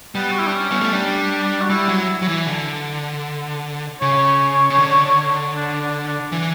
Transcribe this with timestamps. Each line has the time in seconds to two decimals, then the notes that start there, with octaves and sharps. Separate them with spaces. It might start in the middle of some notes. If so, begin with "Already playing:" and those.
0.15 G3 B3
0.31 F#4
0.39 E4
0.47 D4
0.54 C#4
0.71 B3
0.81 A3
0.92 G3 D4
1.61 F#4
1.70 G3 E4
1.89 F#3
1.96 E4
2.22 F#3
2.28 E3
2.47 D3
4.01 C#3 C#5
4.70 C#3
4.78 D3
5.56 D4
5.82 D4
6.07 D4
6.32 E3